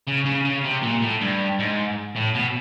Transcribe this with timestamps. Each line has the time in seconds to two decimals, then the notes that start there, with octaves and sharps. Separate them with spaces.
0.07 C#3
0.25 C#3
0.45 C#3
0.64 C3
0.82 A#2
1.02 A2
1.21 G2
1.59 G#2
2.16 A2
2.35 B2